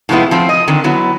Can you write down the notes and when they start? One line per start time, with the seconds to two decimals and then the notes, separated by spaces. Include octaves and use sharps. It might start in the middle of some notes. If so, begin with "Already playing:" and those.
0.09 A2 C3 F3 G#3 B3 E4
0.31 F3 C4 C5
0.49 D#5
0.68 D3 D#3 C4
0.84 F#3 B3 E4